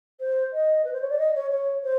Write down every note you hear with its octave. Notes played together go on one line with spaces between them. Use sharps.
C5
D#5
B4
C5
C#5
D5
D#5
C#5
C#5
C5